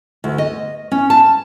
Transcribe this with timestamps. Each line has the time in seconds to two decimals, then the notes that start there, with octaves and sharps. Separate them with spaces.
0.24 D2
0.38 D#5
0.92 C#4
1.10 A5